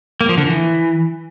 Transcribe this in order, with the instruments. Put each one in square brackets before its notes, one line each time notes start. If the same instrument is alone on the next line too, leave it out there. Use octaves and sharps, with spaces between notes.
[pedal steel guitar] A#3
F3
D3
E3